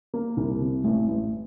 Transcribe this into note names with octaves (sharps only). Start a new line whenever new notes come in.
A#3
C2
C3
A1
A1